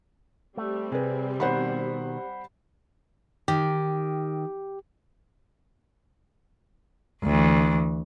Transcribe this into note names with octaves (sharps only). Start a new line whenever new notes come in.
G3 A3 C4
C3 G#4 B4
B2 D#3 C5 F#5 B5
D#3 G4
D2 E3